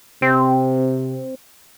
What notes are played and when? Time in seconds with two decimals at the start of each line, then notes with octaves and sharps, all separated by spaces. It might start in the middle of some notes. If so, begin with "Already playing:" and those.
0.22 C3 C4